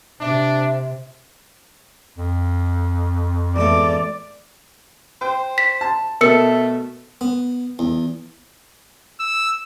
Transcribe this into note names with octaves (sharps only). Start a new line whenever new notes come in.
C3 D4 E5
F2
E2 G#2 A3 D5
C5 G5
B6
A5
B2 A3 A4 A#4 E6 C#7
B3
E2
E6